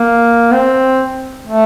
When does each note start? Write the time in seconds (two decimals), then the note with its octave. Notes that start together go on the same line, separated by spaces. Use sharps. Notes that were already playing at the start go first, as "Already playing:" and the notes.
Already playing: A#3
0.52 C4
1.47 A3